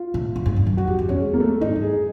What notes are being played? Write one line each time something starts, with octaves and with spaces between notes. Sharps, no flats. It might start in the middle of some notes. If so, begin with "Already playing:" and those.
Already playing: F4
A2
A2
G#2
G2
F#2
F#2 F#4
F#2 G4
F2
E2 C#4
G#3
A#3
A3
G#2 D#4
G2
G#4